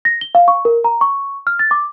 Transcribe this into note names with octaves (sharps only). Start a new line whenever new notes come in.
A#6
G7
F5
C#6
A#4
A#5
C#6
F6
A6
D6